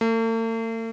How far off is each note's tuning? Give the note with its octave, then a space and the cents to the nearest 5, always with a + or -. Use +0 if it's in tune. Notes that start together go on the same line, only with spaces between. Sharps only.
A3 +45